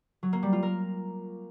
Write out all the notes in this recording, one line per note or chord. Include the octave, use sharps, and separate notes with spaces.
F#3
A#3
G3
F4
A#4